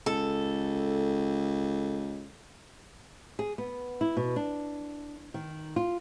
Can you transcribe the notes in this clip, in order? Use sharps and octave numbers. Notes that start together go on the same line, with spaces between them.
C#2 A4
G#4
B3
E4
B2
D4
D#3
F4